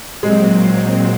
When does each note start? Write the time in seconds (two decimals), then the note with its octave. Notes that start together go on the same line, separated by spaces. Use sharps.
0.23 A#2 F#3 G#3 C4